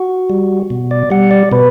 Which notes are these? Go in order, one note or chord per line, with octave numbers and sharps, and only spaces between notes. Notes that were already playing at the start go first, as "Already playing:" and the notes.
Already playing: F#4
G3
B2
D5
G3 F#5
D5
B2 B4